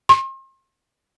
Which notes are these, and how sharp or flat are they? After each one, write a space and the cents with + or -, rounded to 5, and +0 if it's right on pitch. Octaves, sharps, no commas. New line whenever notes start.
C6 +40